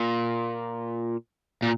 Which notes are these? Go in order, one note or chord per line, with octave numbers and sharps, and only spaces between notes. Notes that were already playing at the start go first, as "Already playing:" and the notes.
Already playing: A#2
A#2